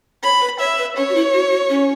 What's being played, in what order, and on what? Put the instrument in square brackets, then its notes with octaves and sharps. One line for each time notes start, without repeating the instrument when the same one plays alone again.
[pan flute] C#5 [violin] B5
[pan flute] B4
[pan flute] C#5 [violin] E5
[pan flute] B4
[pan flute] C#4 [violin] C#5
[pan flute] F#4
E4
F#4
F#4
C#4